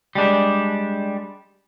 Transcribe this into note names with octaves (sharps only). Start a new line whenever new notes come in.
G3 G#3 D4